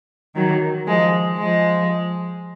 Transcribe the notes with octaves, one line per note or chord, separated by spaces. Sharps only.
D#3 F#3
F3 G#3
F3 G#3